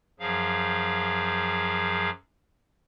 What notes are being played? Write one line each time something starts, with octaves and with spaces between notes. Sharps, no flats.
F#2 F3 F#3 G#4 F5